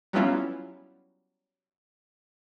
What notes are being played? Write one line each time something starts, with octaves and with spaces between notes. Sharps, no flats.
F#3 G3 B3 C#4 E4 F4